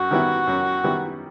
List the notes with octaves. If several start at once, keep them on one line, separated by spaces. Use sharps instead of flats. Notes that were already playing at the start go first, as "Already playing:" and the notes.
Already playing: F#2 F#4
D#3 G3 B3 E4
F#2
D#3 G3 B3 E4